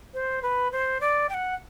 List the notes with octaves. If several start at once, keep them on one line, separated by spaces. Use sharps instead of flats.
C5
B4
C5
D5
G5
F#5